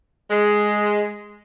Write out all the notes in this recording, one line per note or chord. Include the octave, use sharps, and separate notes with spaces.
G#3